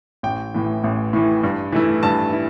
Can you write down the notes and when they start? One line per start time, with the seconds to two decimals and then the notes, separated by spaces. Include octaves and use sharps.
0.23 A1 G5
0.54 A2 E3
0.84 A1
1.13 A2 E3
1.44 G2
1.72 E3 A3 E4
2.03 G2 A5
2.33 E4